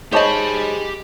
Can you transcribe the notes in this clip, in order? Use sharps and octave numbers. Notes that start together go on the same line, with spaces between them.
G#3 D#4 G4 C5 C#5 D#5 A5 B5